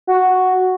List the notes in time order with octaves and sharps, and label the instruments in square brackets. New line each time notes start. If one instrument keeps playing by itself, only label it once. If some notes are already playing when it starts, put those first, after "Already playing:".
[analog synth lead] F#4